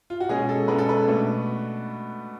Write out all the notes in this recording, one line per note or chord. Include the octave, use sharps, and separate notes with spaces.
F4
F#4
B2 G#3 C#4 G#4
A4
B2 G#3 C#4 B4
A4
B4
B2 A3 D4